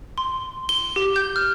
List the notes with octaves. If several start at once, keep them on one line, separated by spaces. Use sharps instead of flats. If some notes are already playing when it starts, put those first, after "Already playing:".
C6
G7
G4
G6
F6